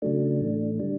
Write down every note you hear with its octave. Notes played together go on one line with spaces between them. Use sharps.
C#3 F#3 A3 D4
A2 E3 A3
D3 G3 D4